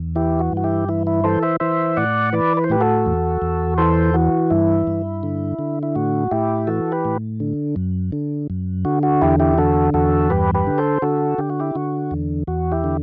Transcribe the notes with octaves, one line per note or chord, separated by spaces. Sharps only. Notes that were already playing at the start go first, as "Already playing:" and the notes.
Already playing: E2
E3 E4 G4
F#4
G2 F#4
E4 G4
E3 E4
E4
E3 A4 C5
C5 E5
E3 C5 E5
A2 D5 F#5
E3 B4 D5
B4
C5
A2 G4 B4
F#4 A4
E2
E2
E3 A4 C5
E3 F#4
G2 E4
G2
D3
D3
E4
A2 F#4
A2 E4 G4
E3 F#4 A4
G4 B4
A2
D3
F#2
D3
F#2
D3 F#4
F#4
E2 E4 G4
E4 G4
D3 F#4 A4
E2 F#4 A4
G2 G4 B4
G4 B4
D3
A4 C5
D3 F#4 A4
D3 G4
F#4
E4 G4
D3 F#4
E2
E2 F#4
E4 G4
D3